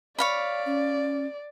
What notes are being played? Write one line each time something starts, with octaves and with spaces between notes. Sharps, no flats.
C#5 D5 F5 B5
C#4